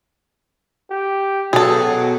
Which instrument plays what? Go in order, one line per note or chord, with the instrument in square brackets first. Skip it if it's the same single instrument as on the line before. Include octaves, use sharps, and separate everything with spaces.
[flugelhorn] G4
[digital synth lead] B2 [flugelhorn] F#3 [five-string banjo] G#4 A4